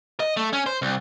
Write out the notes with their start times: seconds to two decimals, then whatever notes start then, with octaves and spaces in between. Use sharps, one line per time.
0.20 D#5
0.37 A3
0.53 C#4
0.66 C5
0.82 C2